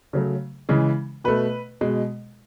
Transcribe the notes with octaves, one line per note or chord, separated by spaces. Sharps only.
C#3 F#3 A3
C#3 E3 G#3
B2 A3 B4
B2 G#3